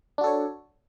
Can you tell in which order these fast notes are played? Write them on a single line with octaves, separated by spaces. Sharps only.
D4 F#4 A4 C#5